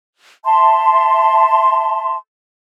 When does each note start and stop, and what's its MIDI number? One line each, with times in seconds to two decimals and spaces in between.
0.45 2.15 76
0.45 2.15 81
0.45 2.15 84